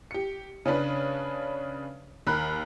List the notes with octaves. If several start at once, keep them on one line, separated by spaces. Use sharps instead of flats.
G4 C#7
C#3 C#4 D4 B4
D#2 A#4 B5 F#6